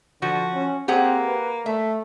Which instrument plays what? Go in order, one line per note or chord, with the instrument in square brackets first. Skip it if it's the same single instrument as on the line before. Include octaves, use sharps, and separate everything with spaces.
[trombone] D3 [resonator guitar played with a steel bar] F3 [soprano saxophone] F#4
[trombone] C#4
[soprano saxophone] A#3 [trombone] C4 [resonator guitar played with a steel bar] G4 G#4 F#5
[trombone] B4
[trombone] A3 [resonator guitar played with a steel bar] E5